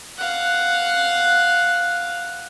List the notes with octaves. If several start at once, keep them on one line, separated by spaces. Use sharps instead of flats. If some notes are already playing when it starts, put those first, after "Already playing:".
F5 F#5